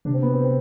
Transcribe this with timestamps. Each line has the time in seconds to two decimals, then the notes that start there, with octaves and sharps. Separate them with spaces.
0.05 C3 D4
0.14 C4
0.22 B3
0.33 C4
0.44 C4